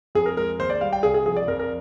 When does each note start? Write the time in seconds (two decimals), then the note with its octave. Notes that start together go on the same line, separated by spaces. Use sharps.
0.15 F2 G#4
0.26 A#4
0.37 G#3 A#4
0.59 D#2 C5
0.70 D5
0.81 G3 F5
0.93 G5
1.03 C2 G#4
1.14 G#4
1.26 F3 G#4
1.37 D5
1.47 F2 A#4
1.59 A#4